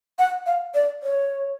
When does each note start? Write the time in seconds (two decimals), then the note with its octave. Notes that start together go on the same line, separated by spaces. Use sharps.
0.19 F#5
0.46 F5
0.74 D5
1.03 C#5